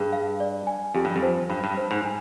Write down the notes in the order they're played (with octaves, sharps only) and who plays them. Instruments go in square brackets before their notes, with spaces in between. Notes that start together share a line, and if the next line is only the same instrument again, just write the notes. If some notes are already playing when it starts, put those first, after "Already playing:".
Already playing: [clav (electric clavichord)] G2 [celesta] G#4
[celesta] F5
D5
G#5
[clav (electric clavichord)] F2 [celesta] G4
[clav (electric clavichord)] G2
F2
[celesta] C5
[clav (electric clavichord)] G2 [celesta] B5
[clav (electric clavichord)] G2
[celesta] C5
[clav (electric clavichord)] G#2
[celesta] G#5